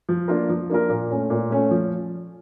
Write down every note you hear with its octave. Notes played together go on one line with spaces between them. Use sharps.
F3
A#3 D4 F4 A#4
F3
A#3 D4 F4 A#4
A#2
A3 C#4
A#2
A3 C#4
F3